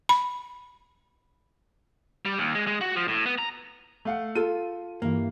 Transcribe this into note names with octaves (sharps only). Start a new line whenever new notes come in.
B5
G3
D#2
G#3
G#3
F#4
F3
A2
B3
A#5
A3 F5 F#5
F4 A4 D#7
G2 E3 A#3 F5